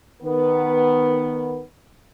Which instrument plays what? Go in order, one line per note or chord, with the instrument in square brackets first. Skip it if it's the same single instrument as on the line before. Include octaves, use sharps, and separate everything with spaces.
[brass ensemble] D#3 B3